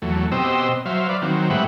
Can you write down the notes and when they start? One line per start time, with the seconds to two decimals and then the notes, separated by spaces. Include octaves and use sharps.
0.02 E2 F#3 A3
0.32 B2 C4 G4 C5 D#5 E6
0.86 F#3 C5 E5 F5
1.09 B4 D5 F5
1.22 D#3 F#3 C4
1.50 A2 G#3 G4 B4 E5 F#5